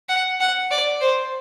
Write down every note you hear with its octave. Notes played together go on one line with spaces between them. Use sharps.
F#5
F#5
D5
C5